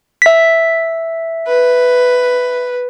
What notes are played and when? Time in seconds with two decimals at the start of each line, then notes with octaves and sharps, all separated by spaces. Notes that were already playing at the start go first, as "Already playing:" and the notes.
0.22 E5 B6
1.47 B4